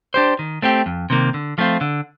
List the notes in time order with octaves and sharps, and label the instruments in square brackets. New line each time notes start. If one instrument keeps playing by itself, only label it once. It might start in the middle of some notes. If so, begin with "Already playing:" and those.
[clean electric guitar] D4 G4 C5
D#3
A3 C4 G4
F2
C3 D#3 A#3
D3
F3 A3 C4 F4
D3